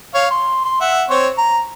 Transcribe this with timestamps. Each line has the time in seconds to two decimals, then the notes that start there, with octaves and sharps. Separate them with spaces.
0.15 C#5 F5
0.30 C6
0.65 C6
0.81 E5 F#5
1.10 C4 C5 C#5
1.38 A#5